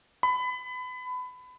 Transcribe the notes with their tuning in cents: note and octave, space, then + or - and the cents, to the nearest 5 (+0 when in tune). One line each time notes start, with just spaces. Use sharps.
B5 +25